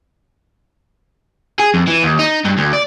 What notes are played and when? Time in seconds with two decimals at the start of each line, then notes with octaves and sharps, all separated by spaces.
1.60 G#4
1.74 F2
1.87 E3
2.03 D#2
2.19 D#4
2.45 G2
2.58 D2
2.73 D5